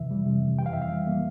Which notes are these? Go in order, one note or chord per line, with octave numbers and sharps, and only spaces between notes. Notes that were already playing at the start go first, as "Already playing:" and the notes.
Already playing: F2 C3 E3 E5
G3
C3
F2
E3 G5
F5
F2 E5
F5
G3
A#3